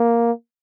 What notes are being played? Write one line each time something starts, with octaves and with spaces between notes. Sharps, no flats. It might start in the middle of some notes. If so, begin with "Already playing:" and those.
Already playing: A#3